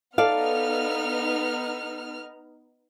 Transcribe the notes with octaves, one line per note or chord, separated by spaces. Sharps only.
B3 D#4 A4 D5 F5 F6